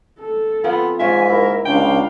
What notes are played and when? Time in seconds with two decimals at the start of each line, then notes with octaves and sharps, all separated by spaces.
0.20 A4
0.64 F3 B3 C4 F4
1.00 G#2 F4 A#4 C#5 E5 G#5
1.29 E4 A#4
1.65 C#2 D4 F5 G5